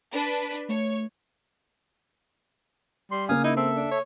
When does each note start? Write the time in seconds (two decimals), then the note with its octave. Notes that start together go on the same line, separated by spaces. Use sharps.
0.12 D4 B4
0.69 A3 C#5
3.11 G3 C6
3.29 C#3 A#3 F5 G#5 D#6
3.44 D#4 E4
3.57 C4 A4 E5
3.76 D4
3.92 C#5